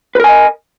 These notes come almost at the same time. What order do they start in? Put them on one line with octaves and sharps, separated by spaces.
B4 A#4 G#5 D#5